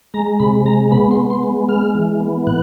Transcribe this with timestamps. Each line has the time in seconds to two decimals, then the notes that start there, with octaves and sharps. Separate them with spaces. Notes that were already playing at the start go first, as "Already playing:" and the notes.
0.14 G#3 A#5
0.40 C3 B5
0.65 G#3 A#5
0.91 B3 B5
1.11 C6
1.17 B3
1.30 C6
1.43 G#3
1.69 G#3 F6
1.95 E3
2.20 B3
2.47 A2 F#6